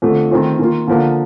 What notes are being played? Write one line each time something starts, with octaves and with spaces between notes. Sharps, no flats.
F2 D3 A3
D#3 A3 C4 F4
D#3 A#3 F4
D3 F3 A#3